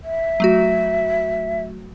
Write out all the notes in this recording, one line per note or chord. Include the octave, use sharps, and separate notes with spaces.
E5
F#3 A3 F#4